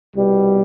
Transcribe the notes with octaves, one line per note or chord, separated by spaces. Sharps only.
C2 B2 G3 B3